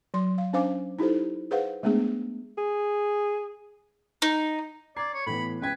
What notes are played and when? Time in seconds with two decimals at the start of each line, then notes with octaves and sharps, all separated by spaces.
0.14 F#3 C6
0.38 F5
0.53 C#4 D4 C5 F5 G#5 D6
0.99 D#4 E4 G4 A4 C5
1.51 G#4 B4 C5 F5 F#5
1.83 G#3 A3 B3 D4 G#4
2.58 G#4
4.22 D#4
4.97 D5 A#5 G#6 C7
5.13 C#5
5.26 A2 E3 B3 B5
5.61 C#2 B4 G5 G#6